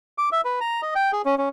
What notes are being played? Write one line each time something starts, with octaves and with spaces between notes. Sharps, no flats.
D6
E5
B4
A#5
D#5
G5
G#4
C#4
C#4